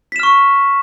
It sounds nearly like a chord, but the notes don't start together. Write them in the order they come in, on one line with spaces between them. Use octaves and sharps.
B6 E7 F6 C#6